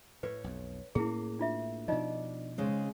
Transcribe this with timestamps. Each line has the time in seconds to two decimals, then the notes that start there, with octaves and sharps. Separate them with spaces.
0.23 A2 B4 C#5
0.44 B1 F2
0.95 A2 A#3 C#4 E4 G#4
1.39 D4 F4 E5
1.88 B2 F3 D4 D#4 F4 D#5
2.58 C#3 G#3 C4